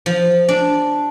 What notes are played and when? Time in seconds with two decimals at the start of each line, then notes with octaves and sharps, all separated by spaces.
0.06 F3
0.48 D4